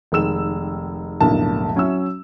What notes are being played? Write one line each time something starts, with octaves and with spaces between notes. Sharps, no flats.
F1 D#3 G#3 E6 E7
F1 B1 A2 D3 A#3 A5
F#3 C#4 E4 E6